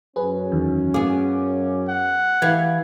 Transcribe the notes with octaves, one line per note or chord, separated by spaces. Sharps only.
F#2 C#4 G#4 B4
E2 D#3 E3
B3 G#4 F5 D6
F#5
E3 G4 F5 G#6